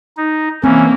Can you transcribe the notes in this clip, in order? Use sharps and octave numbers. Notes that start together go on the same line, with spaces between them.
D#4
E3 A#3 C4 C#4